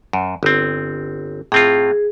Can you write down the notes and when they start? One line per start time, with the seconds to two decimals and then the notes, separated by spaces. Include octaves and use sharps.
0.13 F#2
0.43 G1 C4
1.52 A2 C4 F4 G#4